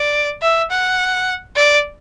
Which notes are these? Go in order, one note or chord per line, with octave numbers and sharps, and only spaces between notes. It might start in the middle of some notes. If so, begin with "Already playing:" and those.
Already playing: D5
E5
F#5
D5